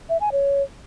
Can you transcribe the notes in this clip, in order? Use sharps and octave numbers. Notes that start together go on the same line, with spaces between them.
E5
G#5
C#5